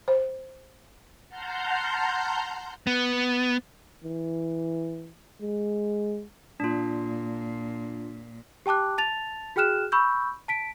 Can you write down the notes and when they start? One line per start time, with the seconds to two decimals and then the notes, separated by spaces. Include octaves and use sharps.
0.08 C5
1.28 F#5 A5 A#5 C6 F6 G6
2.87 B3
4.04 E3
5.42 G#3
6.60 A#2 D4 F4
8.66 G4 G5 A5 D6 F#6
8.98 A5 A6 F7
9.56 F#4 G#4 G5 F6 F#6 E7
9.92 B5 C#6 E6 G6
10.48 A5 B6 D7